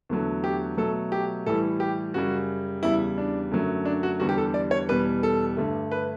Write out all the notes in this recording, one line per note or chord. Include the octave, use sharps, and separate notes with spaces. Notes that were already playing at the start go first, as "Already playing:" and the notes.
E2 D3 F#3 A3
G4
B2 F#3 A3 A4
G4
A2 E3 G3 A4
G4
F#2 C#3 G3 F#4
E2 C#3 G3 E4
D4
F#2 D3 F#3 A3
D4
F#4
E2 D3 G3 F#4
G4
A4
D5
C#5
E2 B2 G3 B4
A4
G2 D3 A3
B4